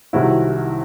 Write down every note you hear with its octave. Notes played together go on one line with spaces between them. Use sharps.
C2 C3 D#3 F#3 E4 F#4